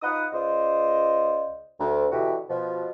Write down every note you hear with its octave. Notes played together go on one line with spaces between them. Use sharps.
D#4 F4 B4 F#5 D#6
C#2 F4 C5 D5 D#5
D2
B2 D3 E3 E4 F#4 G4
B2 F3